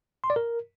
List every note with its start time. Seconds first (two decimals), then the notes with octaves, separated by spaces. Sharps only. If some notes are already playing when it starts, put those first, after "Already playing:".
0.24 C6
0.30 D5
0.36 A#4